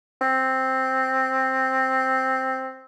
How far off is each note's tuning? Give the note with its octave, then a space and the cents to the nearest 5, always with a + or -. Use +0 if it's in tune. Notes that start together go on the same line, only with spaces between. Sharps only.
C4 +5